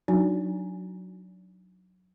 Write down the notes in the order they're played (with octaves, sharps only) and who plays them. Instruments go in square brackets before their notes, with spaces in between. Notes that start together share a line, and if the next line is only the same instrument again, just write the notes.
[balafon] F#3 D4 D#4 F#4 G#5